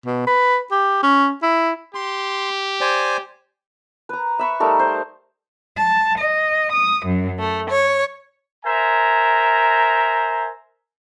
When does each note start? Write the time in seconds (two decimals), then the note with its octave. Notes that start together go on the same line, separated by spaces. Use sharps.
0.07 B2
0.27 B4
0.72 G4
1.03 C#4
1.43 E4
1.95 G4 C6
2.81 C5 D5 G#5
4.09 B4 A#5
4.39 E5 B5 C#6
4.60 G3 A3 D#4 A#4
4.79 C5
5.77 A5
6.18 D#5
6.72 D#6
7.06 F#2
7.39 A3
7.70 C#5
8.66 A#4 C5 E5 G#5 A#5